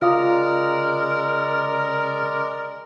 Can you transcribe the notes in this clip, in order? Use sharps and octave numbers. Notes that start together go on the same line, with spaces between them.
C#3 G#3 F4 A#4 D5 F5 A#5 D#6